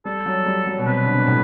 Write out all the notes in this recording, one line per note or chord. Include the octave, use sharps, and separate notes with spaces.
G3 A4
F#3
G3
F#3
B2
C3 B4
D3
C3
B2
A2